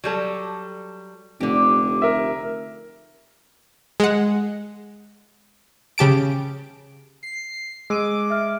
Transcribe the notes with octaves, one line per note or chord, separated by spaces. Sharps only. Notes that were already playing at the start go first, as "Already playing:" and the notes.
F#3 G3 A4
F1 D3 G4
A#4 E5
G#3 F#5
C#3 G4 A5 D7
C7
G#3 D6 E6 D#7
E5 F6